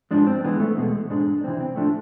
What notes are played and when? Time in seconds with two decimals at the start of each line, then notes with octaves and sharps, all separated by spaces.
0.11 G#2 F3 G#3 D4
0.27 C4
0.44 F2 E3 G#3 B3
0.60 A3
0.77 E2 B2 G#3
1.10 G#2 G#3 D4
1.44 F2 C3 E3 C4
1.61 C4
1.76 A2 F3 A3 D4